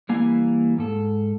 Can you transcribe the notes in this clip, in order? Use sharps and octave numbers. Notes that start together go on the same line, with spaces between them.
E3 G3 A#3 F5 G#5
G#2 A4